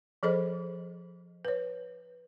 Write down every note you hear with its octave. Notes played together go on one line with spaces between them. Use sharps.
F3 G#4 A4 C5 D#5 B5
B4 C#5